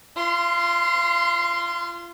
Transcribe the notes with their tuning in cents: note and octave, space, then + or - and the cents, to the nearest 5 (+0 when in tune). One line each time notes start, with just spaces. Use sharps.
F4 -30 C6 +0